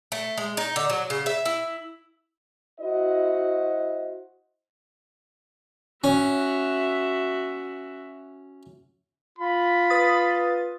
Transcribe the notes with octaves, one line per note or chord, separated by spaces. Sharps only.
A3
G#3
D#4
D3
F#3
C#3
E5
E4
E4 F#4 C5 D#5
C#4 F#4 E5
F4 B5
B4 D#6 A6